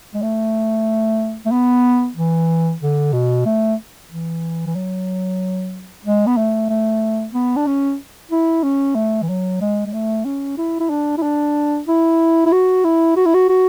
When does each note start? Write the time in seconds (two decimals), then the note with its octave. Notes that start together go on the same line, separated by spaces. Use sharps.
0.14 G#3
0.22 A3
1.46 A3
1.51 B3
2.16 E3
2.81 D3
3.13 B2
3.45 A3
4.10 E3
4.66 E3
4.75 F#3
6.04 G#3
6.26 B3
6.37 A3
6.69 A3
7.33 B3
7.56 D4
7.67 C#4
8.31 E4
8.63 C#4
8.95 A3
9.22 E3
9.29 F#3
9.61 G#3
9.86 G#3
9.93 A3
10.25 C#4
10.58 E4
10.80 E4
10.90 D4
11.17 E4
11.22 D4
11.87 E4
12.46 E4
12.52 F#4
12.84 E4
13.17 F#4
13.26 E4
13.34 F#4
13.49 F#4